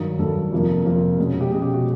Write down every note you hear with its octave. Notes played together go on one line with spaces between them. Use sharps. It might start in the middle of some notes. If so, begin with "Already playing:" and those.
Already playing: G2 D#3 F#3
G2 D#3 F#3 A4
F2 C3 F3 A#3
F2 C3 F3 A#3
B2 G#3 C#4
G4
B2 G#3 C#4 G#4
G4
F#4